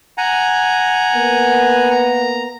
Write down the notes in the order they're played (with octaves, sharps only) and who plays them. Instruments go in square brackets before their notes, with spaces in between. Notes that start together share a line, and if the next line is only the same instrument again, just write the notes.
[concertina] F#5 G#5 A#5
[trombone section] A#3 B3
[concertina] A#5